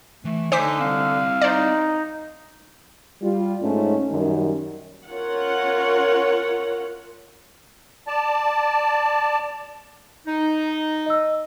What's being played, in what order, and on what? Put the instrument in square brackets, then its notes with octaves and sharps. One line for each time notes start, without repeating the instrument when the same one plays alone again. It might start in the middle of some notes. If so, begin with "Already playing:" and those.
[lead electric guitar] E3 [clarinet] A3
[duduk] D3 [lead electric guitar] D#4 A#5 [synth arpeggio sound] C5 D6 B6 [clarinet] G#5
[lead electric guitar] G3 C4 [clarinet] F5
[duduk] D#4 [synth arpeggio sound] C5 D5
[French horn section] G3 F4
G#2 A3 C#4
F#2 D#3 G3
[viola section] C#4 F4 A#4 C#5 F#5
[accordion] D5 A5
[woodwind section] D#4
[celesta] D#5 E6